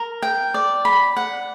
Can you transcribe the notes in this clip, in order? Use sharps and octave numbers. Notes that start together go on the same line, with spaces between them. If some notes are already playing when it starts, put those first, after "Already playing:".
Already playing: A#4
G5
D5
B5
F#5